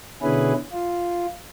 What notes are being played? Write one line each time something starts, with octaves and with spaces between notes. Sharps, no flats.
B2 D3 C#4 E4 G#4 B4
F4